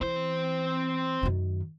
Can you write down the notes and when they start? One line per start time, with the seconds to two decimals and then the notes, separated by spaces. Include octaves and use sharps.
0.01 E3 C4 C5
1.23 F#2 D#3